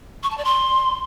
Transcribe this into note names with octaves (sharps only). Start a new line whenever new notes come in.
C#6
A5
D5
C6